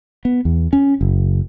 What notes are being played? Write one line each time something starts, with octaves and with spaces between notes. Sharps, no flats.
B3
E2
C#4
F#1